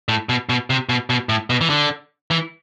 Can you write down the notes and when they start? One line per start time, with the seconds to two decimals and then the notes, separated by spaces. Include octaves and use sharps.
0.09 A2
0.29 B2
0.49 B2
0.70 C3
0.89 B2
1.10 B2
1.29 A2
1.50 B2
1.61 E3
1.70 D3
2.31 E3